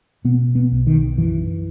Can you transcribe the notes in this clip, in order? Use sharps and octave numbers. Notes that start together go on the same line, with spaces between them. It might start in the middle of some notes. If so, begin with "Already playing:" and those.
B2 B3
B3
B1
D#3
F#2 E3